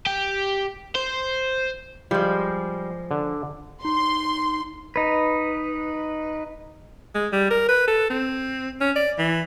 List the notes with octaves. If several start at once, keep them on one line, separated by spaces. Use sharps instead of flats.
G4
C5
F3 G3 G#3
D3
D#4 C6
D#4 B4
G#3
G3
A#4
B4
A4
C4
C#4
D5
E3